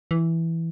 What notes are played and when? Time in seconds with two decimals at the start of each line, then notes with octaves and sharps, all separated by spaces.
0.11 E3